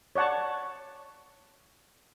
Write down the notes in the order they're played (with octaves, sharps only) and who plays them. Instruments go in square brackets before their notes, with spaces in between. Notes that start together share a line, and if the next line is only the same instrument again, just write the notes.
[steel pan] C#5 D5 F#5 A5 C#6